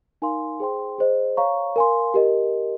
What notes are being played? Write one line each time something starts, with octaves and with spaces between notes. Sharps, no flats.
D#4 A#4 F5 G#5 C6
G#4 C5 G5 C6
G#4 C5 D#5
C#5 F5 A#5 C#6
A#4 F5 G#5 C6
G4 A#4 D#5